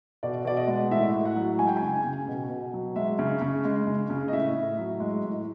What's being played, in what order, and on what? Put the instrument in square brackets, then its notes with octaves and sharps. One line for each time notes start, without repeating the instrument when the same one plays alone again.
[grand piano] B2 D5
B2 D5
D#5
G#3
A2 E5
A2
F#5
F#3
G#3 G#5
G5
G#5
C#3
C#3
B2
B2
F#3
G#3 E5
C#3
C#3
G#3
C#3
C#3
D#5
A2 E5
A2
F#3
G#3
A2